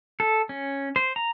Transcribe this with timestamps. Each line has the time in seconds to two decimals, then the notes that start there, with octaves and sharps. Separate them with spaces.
0.20 A4
0.49 C#4
0.96 C5
1.16 A#5